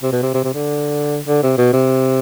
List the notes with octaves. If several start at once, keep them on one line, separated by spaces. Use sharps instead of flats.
C3
B2
C3
C3
C3
D3
D3
C3
B2
C3